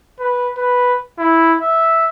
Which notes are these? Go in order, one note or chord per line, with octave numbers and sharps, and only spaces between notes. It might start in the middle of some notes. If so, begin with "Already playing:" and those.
B4
B4
E4
E5